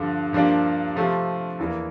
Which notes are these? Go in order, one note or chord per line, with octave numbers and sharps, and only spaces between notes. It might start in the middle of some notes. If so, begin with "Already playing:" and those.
Already playing: G2 D3 F3
G2 F3 A#3 D4
C3 F3 A3 C4 F4
E2 E3 A#3